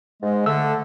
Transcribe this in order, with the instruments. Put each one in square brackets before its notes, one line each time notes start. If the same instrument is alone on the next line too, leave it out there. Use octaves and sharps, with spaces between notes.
[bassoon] G#2 [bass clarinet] G#3
[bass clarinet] D3 [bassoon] A3 [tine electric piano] E6